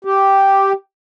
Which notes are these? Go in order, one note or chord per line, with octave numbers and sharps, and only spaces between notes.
G4